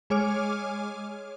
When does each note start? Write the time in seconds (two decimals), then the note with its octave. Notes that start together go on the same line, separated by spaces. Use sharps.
0.10 G#3 G#4 C#5 G#5 D6 F6